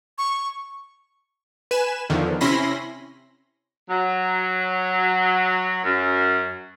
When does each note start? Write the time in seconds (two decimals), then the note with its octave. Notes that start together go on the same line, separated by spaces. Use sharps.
0.18 C#6
1.71 B4 G#5 E7
2.10 E2 D3 D#3 F3
2.41 C3 C#4 E4 B5 C6 A#6
3.90 F#3
5.84 F#2